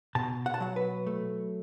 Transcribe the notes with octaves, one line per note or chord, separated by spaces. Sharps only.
B2 A5
F#5
A5
F#3 F#5
B4
A3